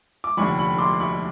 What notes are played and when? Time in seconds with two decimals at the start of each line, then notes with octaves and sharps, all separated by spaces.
0.24 D6
0.37 F1 D#2 D3 B5 C#6
0.58 B5 C#6
0.78 C6 D6
1.00 B5 C#6